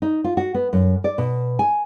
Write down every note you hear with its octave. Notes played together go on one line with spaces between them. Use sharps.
D#4
F4
F#4
B3
F#2
D5
B2
G#5